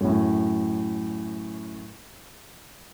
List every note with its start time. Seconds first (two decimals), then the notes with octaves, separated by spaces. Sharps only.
0.01 F#2 A2